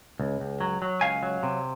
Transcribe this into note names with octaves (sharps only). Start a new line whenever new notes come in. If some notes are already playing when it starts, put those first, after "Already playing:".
C#2
C#2
F#3
F#3
C#2 F5 G#5
F#3
C3